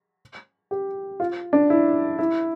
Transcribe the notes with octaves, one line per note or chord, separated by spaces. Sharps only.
G4
F4
D4
E4
E4